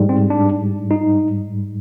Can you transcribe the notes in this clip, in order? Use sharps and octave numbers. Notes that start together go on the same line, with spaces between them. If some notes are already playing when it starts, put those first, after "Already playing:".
Already playing: G#2 G3
C4
D4
D#4